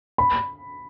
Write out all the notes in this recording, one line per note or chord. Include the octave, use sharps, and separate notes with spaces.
B5